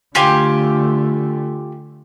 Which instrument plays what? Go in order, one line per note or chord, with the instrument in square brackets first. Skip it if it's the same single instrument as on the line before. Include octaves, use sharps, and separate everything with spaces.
[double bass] D3 A3 [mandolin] F4 G4 G#5